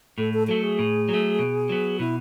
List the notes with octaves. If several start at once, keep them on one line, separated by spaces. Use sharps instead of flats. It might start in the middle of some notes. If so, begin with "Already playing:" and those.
A2 A4
A4
F#3 A3 A4
G#4
A2
F#3 A3
B2
F#3 B3
B2 E4